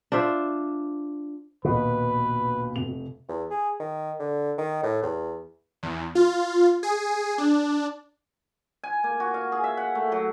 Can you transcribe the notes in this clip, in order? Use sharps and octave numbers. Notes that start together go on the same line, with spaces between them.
D4 F4 C5 E5
A#1 D#2 B2 B4
F1 F7
E2
G#4
D#3
D3
D#3
A2
E2
E2
F4
G#4
D4
G#5
A#3
F#4
F5
G#4
E5
F#5
A3
F#3